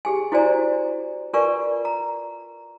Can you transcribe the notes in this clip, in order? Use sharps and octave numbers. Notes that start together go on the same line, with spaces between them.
G4 G#4 G#5
E4 F#4 C5 D5 G#5 A#5
F4 A#4 B4 D5 G#5 C#6
A#5